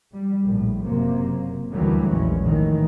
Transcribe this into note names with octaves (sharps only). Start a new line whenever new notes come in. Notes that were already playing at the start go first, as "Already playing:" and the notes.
G3
A#1 A2
F#1 C3 F#3 A#3
D2 D#3 E3 F#3 G3 A3
A#1 E2 G#3 C#4
A1 A2 D#3 E3